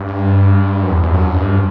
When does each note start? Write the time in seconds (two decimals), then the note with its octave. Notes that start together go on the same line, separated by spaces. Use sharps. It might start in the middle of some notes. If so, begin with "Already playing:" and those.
Already playing: G2
0.83 F#2
0.91 E2
1.03 E2
1.14 F#2
1.35 G2